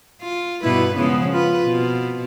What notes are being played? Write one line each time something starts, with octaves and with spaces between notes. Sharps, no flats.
F4
G2 B2 E4 B4
C#3 F3 G#3 B3
F4 B4
B2 C4